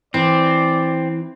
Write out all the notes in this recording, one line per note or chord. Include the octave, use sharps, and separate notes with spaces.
E3 C4 D5